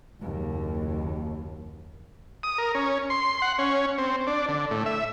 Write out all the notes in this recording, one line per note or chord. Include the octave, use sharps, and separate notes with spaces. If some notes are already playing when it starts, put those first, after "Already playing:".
F#1 D#2
D#6
A#4
C#4
C6
F#5
C#4
C4
D4
D3
A2
E5